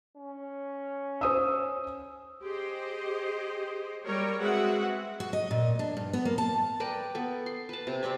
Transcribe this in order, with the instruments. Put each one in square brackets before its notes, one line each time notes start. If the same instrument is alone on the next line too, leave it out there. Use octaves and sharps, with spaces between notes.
[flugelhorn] C#4
[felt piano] C5 D#6 E6
[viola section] G4 G#4 C5 D#5
G3 A#4 C#5
G#3 C4 F#4 B4 E5 F#5
[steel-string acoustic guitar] F#4
D#5
A#2
D4
G2
B3
A#3
A5
[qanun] A#4 B4 D5 G5
B3 A4
C6
B4 A5
C3
C3 C4 D5 E5